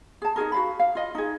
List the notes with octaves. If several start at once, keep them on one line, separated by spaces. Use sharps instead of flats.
G#4 A5
D#4 F#4 G#4 A#4
F#4 F5 B5
F5
F4 D#5
D#4 G#4